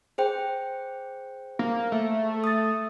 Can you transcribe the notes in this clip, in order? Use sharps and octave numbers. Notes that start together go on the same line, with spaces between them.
G#4 C5 G5
A#3
A3
D#6 A6